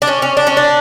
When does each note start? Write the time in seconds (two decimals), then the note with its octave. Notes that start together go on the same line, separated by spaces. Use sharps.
0.02 D4
0.07 C#4
0.22 C#4
0.37 D4
0.47 C#4
0.57 D4